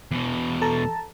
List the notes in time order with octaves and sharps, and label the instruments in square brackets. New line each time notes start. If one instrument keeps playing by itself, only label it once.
[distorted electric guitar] E2 B2
[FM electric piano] A4 A5 A#5